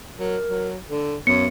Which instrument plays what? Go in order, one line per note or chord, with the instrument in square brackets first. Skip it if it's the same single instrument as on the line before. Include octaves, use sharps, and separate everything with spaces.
[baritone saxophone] F#3 [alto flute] A#4
[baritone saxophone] F#3
[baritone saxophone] D3 [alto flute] A4
[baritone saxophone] F#2 [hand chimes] B3 [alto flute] C#5 [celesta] C#7